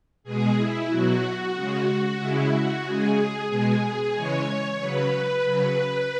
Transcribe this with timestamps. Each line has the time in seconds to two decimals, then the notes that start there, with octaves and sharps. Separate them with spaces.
0.24 B2 G#3 G#4
0.56 E4
0.89 B2 F#3 F#4
1.55 C#3 G#3
2.19 C#3 G#3 E4
2.52 F#4
2.84 C#3 G#3 G#4
3.49 B2 G#3
4.14 C#3 E3 G#3 C#5
4.79 C#3 F#3 B4
5.45 C#3 F#3